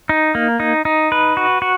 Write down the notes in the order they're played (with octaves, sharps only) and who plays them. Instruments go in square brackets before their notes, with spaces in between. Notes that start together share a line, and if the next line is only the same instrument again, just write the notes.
[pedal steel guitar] D#4
A#3
D#4
D#4
B4
F#4
F#4